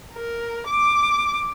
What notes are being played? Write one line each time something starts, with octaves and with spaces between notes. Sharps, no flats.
A#4
D6